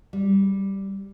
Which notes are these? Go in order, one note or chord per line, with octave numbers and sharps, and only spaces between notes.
G3